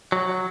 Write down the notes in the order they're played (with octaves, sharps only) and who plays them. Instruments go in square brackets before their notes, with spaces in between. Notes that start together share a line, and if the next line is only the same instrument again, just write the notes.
[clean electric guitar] F#3